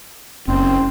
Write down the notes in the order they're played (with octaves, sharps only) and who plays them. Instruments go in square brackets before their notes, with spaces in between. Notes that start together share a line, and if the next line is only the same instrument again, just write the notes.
[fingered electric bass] F#1 C#4 [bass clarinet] C4